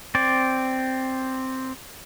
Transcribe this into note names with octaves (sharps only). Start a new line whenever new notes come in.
C4 D5